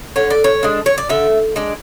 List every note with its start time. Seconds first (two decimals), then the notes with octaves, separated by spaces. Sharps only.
0.16 D3 C#5
0.30 D5
0.44 C#5
0.63 G#3 D4
0.86 C#5
0.98 D5
1.09 D3 E5
1.56 G#3 D4